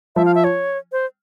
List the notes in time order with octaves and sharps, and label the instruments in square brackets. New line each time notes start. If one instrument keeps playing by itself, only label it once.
[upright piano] F3 [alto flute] E5
[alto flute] F5
E5
C#5
C5